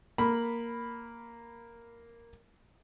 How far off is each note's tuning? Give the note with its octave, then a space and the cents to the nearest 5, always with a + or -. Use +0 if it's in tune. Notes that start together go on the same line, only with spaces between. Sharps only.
A#3 +0 B5 +0